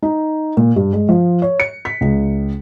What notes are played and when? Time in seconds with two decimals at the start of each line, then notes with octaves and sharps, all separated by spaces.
0.02 D#4
0.57 A#2
0.76 G2
0.93 G#3
1.09 F3
1.42 C#5
1.60 C#7
1.85 B6
2.01 C#2